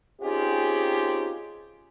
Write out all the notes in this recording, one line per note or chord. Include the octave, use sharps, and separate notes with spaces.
C4 C#4 D#4 F4 G4 G#4